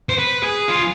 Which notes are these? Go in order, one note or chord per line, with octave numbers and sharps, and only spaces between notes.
C5
B4
G#4
F4
G#4